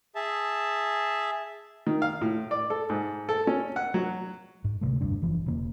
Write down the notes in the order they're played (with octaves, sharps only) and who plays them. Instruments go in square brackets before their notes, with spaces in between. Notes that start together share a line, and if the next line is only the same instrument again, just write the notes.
[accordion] G#4 E5 A5
[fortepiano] D#3
F5
A2
D5
A4
G#2
A4
C#4
F#5
F#3
[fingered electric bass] G#2
D2 C3 E3 A3
F1 D2 G2 D4
F#1 E3 F3
E1 C#3 A#3